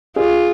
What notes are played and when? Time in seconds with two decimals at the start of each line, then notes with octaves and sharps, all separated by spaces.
0.16 F4 G#4